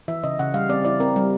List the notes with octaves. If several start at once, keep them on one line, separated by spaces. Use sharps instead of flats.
E3 E5
C#3 D#5
C#3 F#5
G3 F5
C4 D5
E4 D5
C4 A#4
G3